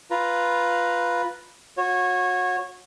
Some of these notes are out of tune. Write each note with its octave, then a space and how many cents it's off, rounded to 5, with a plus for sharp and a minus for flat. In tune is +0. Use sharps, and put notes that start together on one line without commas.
F4 +0 B4 +0 A#5 +0
F#4 -30 C#5 -20